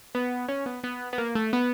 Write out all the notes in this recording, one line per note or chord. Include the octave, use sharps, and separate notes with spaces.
B3
C#4
B3
B3
B3
A#3
A3
B3